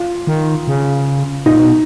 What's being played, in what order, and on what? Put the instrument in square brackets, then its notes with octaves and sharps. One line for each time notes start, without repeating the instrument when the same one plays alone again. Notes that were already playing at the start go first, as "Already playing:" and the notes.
Already playing: [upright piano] F4
[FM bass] D#3
C#3
[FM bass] A#2 [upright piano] D#4
[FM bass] B2